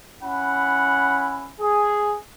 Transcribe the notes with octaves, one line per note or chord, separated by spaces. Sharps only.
C#4 E4 F#5 B5
G#4